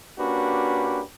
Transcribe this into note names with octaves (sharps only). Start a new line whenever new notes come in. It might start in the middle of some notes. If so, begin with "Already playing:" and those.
A#3 C#4 D4 F#4 G4 B4